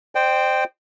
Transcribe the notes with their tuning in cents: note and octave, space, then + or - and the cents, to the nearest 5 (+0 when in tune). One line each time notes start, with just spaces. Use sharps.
C5 +0 D#5 -45 G5 +0